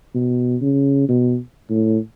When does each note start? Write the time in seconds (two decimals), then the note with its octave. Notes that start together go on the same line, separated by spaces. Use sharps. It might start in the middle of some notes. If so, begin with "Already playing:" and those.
0.15 B2
0.62 C#3
1.09 B2
1.70 A2